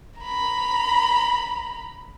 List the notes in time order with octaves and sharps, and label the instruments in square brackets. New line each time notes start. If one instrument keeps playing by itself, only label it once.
[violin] A#5 B5